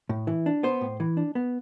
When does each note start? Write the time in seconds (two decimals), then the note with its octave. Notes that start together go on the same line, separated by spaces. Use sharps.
0.09 A2
0.27 E3
0.46 D4
0.63 B3 C5
0.81 A2
1.00 E3
1.17 D4
1.35 B3